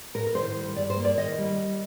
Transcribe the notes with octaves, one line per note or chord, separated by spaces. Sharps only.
A2 A#4
A#4
D#3 C5
G3
G2 D5
C5
A#3
D5
D#3 D#5
G3